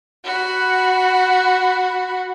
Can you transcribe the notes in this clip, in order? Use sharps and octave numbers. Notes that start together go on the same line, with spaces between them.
F#4 B5